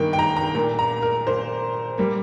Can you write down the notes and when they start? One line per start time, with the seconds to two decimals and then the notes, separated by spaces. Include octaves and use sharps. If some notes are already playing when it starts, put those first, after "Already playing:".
Already playing: G2 D#3 A#3 G5
0.13 G5
0.19 A#5
0.37 A#5
0.55 A#2 A#3
0.79 A#5
1.02 A#4
1.27 A#2 A#3 C5
1.98 G3 A#3